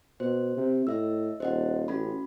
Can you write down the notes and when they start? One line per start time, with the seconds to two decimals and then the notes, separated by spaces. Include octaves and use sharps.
0.20 B2 C5
0.57 C3
0.87 A2 D#5 E5 E6
1.40 D#1 C5 D#5 F#5
1.88 A1 C#4 F#4 B5